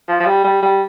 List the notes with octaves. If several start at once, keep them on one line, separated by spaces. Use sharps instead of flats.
F3
F3
G3
G3
G3